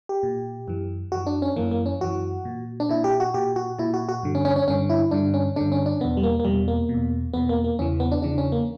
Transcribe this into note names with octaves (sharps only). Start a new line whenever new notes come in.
G4
A#2
F#2 E3
F#2 E3 F#4
D4
C#4
F#2 E3 A#3
A#3
C#4
F#2 E3 F#4
A#2
D4
A#2 E4
G4
F#4
A#2 G4
F#4
A#2 E4
F#4
F#4
G2 D3
C#4
C#4
C#4
G2 D3 C#4
E4
G2 D3 D4
C#4
G2 D3 D4
C#4
D4
E2 B2 B3
G3
A#3
A#3
E2 B2 G3
A#3
B2
E2
E2 B2 B3
A#3
A#3
E2 C#3 E3 C#4
B3
D4
E2 C#3 E3 D4
C#4
A#3